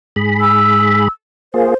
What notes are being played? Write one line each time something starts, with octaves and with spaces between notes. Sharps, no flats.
G#2 G#4 B5
E6
A#3 F4 G#4 C5